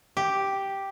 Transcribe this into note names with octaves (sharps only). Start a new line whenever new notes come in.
G4